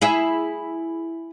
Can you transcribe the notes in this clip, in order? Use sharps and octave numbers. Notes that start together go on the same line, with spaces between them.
E4 G#4 E5